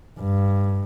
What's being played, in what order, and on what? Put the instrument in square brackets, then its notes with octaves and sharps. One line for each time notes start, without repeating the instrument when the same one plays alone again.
[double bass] G2